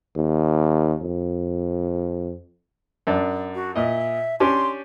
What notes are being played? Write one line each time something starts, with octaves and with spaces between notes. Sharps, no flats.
D#2
F2
F#2 D4 D5
F#4
A#2 D#5 E5
C#4 D4 G4 C6